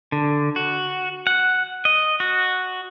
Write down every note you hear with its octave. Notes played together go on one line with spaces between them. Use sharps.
D3
F#4
F#5
D#5
F#4